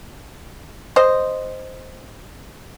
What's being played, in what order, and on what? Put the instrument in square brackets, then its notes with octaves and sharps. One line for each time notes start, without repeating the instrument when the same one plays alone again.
[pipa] C5 D#5